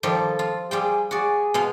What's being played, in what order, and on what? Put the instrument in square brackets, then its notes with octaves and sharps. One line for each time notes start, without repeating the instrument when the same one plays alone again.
[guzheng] D#3 F3 G3 [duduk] A4
[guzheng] F4
[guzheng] G3 F4 G5 [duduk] G#4
[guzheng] F#4 D5 [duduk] G#4
[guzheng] B2 G#3 F5